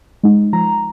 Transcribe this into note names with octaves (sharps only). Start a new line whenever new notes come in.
G#3 D#4
F3 A#5